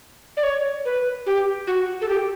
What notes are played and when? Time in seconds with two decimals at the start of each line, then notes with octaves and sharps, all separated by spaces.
0.37 D5
0.43 C#5
0.85 B4
1.26 G4
1.67 F#4
2.01 A4
2.09 G4